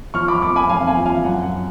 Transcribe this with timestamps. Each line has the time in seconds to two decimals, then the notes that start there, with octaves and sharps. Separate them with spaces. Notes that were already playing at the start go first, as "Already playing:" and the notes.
0.14 F3 C#6 F6
0.28 B5 D6
0.42 F2 B5 D6
0.56 G#5 B5
0.69 F2 F5 G#5
0.87 F5 G#5
0.97 F3
1.06 F5 G#5
1.24 F#2 F#5
1.42 F#5